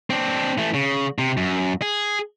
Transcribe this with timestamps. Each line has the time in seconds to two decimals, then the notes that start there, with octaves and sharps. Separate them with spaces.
0.10 C4 D4
0.58 E3 A3
0.74 C#3
1.19 C3
1.37 F#2
1.82 G#4